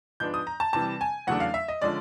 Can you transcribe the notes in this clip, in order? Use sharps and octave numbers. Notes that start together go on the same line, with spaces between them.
G#2 F3 G#3 B3 D4 G6
D#6
A#5
A5
C3 E3 G3 A5
G#5
E2 C#3 F#3 A3 D4 F#5
F5
E5
D#5
D3 F3 G#3 C#4 D5